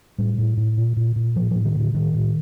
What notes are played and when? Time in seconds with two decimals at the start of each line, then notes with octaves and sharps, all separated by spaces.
0.18 A2 G3
0.38 A2
0.57 A2
0.77 A#2
0.97 A#2
1.16 A#2
1.36 A2 F3
1.51 A2 F3
1.65 D#3
1.75 A2 D3
1.94 A2 D#3
2.14 A2